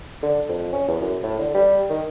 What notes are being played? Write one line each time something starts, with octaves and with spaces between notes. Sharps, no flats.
D3
F2
C#4
E2
F#2
A2
D3
G3
D#3